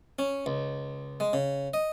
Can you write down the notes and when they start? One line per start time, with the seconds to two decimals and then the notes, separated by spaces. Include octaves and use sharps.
0.19 C#4
0.46 C#2
1.20 G#3
1.33 C#3
1.74 D#5